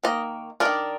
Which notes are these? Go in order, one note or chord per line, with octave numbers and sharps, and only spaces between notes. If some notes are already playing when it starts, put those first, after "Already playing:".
D#3 A#3 D#5
A#3 D4 A#4 D5
D#3